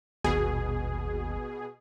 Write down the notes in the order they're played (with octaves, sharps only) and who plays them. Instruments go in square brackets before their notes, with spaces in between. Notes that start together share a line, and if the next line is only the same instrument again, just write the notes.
[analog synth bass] D#1 [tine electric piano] G#1 [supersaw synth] B2 G#4